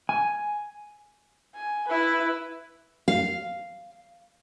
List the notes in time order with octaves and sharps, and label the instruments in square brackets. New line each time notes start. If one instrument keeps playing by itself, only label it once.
[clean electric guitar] G#5
[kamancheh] G#5
E4 B4
[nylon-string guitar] F5